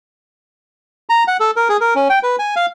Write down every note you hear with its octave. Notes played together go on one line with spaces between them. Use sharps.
A#5
F#5
A4
A#4
G#4
A#4
C#4
G5
B4
G#5
F5